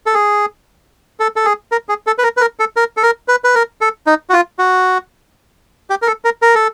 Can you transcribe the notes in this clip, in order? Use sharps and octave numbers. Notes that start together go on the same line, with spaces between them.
A4
G#4
A4
A4
G#4
A#4
G#4
A4
B4
A#4
B4
A#4
A4
A#4
A4
A#4
B4
B4
A#4
A4
D#4
F#4
F4
F#4
G4
A#4
A4
A#4
A#4
A4